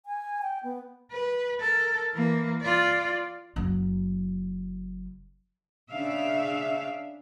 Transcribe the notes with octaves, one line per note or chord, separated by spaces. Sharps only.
G#5
G5
B3
B4
A4 A#4
E3 A#3
F4 D5
F#1 F#3
C#3 D4 E5 F5